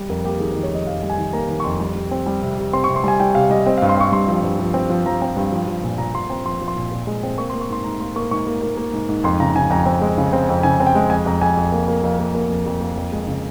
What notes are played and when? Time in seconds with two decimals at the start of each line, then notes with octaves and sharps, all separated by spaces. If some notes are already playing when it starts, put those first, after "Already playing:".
Already playing: G3
0.09 F2 A#4
0.24 A#3 G4
0.40 D#3 G#4
0.52 A#4
0.56 D#3
0.63 C#5
0.72 F2 D#5
0.87 F2 F5
1.03 G3
1.10 G#5
1.18 D#3
1.33 A#3 A#5
1.48 D#3 A#5
1.60 C#6
1.64 F2 C6
1.80 G3
1.95 G3
2.11 C4
2.26 G3
2.42 C3
2.58 C3
2.73 C4 C6
2.84 C#6
2.89 C3
2.96 C6
3.04 G3 G#5
3.20 G3 G5
3.34 C3 F5
3.50 G3 D#5
3.66 C4 D#5
3.78 F5
3.82 G2
3.89 C6
3.97 C4 C#6
4.12 G2 C6
4.28 F3
4.43 G2
4.60 F3
4.74 C4
4.90 F3
5.06 F3 A#5
5.22 C4
5.36 G2
5.52 F3
5.67 F3
5.84 A#2
5.98 A#2 A#5
6.14 A#2 C6
6.30 C4 A#5
6.45 F3 C6
6.61 F3
6.68 C6
6.76 A#2
6.91 A#2
7.07 G#3
7.23 C4
7.38 A#3 C#6
7.50 C6
7.53 A#3
7.61 C#6
7.69 G#2 C6
7.84 G#2 A#5
8.00 A#3 C6
8.16 A#3 C#6
8.31 G#2 C#6
8.47 A#3
8.62 A#3
8.77 A#3
8.93 G#2
9.09 G#2
9.24 F2 C6
9.40 C#3 A#5
9.55 C#3 G#5
9.70 F2 A#5
9.86 C4
10.01 G#3
10.18 C#3
10.33 C4
10.49 F2
10.63 C#3 G#5
10.80 C4
10.87 G5
10.95 G#3
11.10 F2 G#5
11.26 F2 A#5
11.41 F2 G#5
11.57 F2
11.72 A#3
11.88 A#3
12.04 F2 F5
12.19 A#3
12.35 A#3
12.50 F2
12.66 F2
12.81 A#3
12.97 F2
13.12 G#3
13.27 C#3